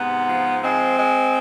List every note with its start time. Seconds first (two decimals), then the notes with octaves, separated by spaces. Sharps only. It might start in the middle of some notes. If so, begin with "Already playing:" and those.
Already playing: G#2 C3 B3
0.28 F3
0.63 G#3 C4
0.98 G#3